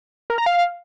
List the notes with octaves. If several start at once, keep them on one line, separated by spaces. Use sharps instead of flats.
A#4
A#5
F5